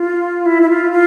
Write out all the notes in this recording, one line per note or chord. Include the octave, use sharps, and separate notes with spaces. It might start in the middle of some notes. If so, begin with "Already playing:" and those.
Already playing: F4
E4
E4
F4
F4